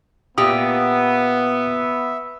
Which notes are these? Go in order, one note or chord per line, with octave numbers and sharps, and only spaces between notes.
A#2 B3 G4 E5 D#6